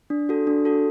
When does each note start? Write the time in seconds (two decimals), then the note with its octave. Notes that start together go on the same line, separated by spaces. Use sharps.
0.10 D4
0.29 F#4 A4
0.47 D4
0.65 F#4 A4